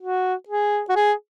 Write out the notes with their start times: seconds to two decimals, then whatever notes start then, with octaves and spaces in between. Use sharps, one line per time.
0.01 F#4
0.49 G#4
0.89 F#4
0.96 G#4